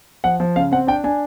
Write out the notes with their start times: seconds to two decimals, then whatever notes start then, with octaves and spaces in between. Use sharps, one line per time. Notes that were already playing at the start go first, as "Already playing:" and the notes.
0.24 F3 F#5
0.40 F3
0.56 C#3 F5
0.71 C4 F#5
0.87 D4 G5
1.04 D4 G#5